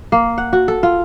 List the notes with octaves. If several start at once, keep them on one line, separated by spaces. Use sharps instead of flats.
A#3
F#5
F#4
A4
F4